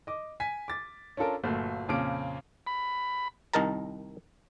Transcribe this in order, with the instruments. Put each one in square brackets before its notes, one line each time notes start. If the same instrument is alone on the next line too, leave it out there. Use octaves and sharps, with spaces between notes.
[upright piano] D#5 D6
G#5 B6
D6 A6
C#4 D4 F4 A4 A#4
G1 A#2 F#3 A3 A#3
F2 A#2 C#3 C#4 D6 D7
[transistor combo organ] B5
[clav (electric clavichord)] C2 D#3 D#4 A#4 A5 A#5